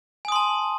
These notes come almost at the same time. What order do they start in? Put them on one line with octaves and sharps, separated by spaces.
G#5 D#6 C6 A5